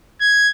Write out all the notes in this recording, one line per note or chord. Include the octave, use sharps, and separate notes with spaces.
G#6